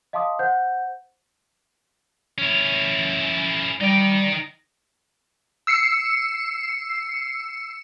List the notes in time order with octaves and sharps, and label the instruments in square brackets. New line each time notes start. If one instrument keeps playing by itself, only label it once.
[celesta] D#5 F5 A5 C6 D6 D#6
C5 F#5 G6
[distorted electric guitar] C#4 E4
[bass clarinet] G3 [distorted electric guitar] D#4 G5
[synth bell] E6 C7 C#7